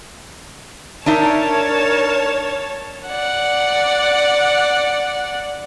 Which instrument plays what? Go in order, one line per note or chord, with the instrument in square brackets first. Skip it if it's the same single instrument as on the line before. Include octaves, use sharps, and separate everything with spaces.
[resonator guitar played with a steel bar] D4 D#4 E5 [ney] A#4 [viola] C#5 A5
[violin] D5 F#5